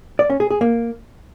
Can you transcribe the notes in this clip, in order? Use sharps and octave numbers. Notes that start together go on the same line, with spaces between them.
D5
C#4
G#4
G#4
A#3